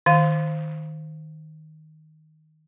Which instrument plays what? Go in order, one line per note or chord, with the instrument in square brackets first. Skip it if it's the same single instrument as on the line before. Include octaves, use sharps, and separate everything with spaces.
[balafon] D#3 F5